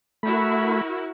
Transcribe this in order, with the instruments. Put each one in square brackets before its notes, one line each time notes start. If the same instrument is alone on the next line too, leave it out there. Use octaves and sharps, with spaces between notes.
[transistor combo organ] A3 B5 [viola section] E4 F#4 A#4